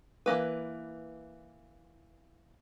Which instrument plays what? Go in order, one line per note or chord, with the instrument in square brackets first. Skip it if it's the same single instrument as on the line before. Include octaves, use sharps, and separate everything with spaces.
[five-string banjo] E3 F3 A#3 B4